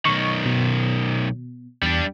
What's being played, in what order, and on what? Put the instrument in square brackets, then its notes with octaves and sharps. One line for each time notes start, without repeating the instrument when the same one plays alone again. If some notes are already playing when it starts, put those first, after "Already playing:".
[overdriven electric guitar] B1 D#3 [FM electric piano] C#6
[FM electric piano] B2
[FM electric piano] E2 [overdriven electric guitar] G3 D4